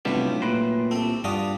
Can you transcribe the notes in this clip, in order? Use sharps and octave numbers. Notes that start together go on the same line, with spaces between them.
B1 A2 C3 G3 B3 D4 E4 F4
A#2 B4 C6
C2 C4 A4
G2 G3 D4 F4 F#4 D#6